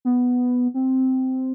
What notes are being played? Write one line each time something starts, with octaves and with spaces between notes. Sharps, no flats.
B3
C4